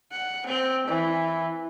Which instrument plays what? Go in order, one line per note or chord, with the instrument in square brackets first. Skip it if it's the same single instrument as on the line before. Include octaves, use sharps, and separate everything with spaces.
[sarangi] F#5
C4
[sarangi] E3 [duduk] E4